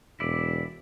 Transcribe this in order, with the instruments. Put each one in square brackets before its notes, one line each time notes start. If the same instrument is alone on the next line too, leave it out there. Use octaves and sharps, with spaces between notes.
[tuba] E1 [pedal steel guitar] E4 D5